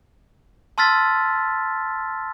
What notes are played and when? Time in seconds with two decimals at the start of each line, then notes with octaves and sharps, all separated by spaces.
0.78 A5 C6 E6 F6 A6 B6